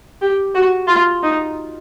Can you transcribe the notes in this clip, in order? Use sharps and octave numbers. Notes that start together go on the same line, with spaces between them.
G4
F#4
F4
D#4